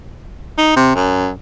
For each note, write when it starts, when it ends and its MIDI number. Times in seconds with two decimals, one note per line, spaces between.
0.58 0.73 63
0.76 0.95 48
0.95 1.30 42